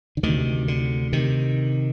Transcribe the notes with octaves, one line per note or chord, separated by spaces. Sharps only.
D3
D2 C3 D#3
D3
C3 D#3